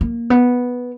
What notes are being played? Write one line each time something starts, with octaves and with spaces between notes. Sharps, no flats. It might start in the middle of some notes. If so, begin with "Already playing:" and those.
A#3
B3